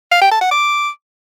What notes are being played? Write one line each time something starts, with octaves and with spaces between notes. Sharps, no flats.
F5
G5
A5
F#5
D6